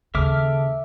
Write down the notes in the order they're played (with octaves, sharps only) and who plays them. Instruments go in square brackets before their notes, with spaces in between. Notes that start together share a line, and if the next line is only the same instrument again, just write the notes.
[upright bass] D#2 [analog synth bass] C#3 [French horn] A4 [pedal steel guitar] E5 D6 F6